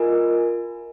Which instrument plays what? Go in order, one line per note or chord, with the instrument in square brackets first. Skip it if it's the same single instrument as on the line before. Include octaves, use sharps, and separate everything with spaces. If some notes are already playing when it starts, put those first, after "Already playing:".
Already playing: [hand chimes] F4 A#4 D#5 G#5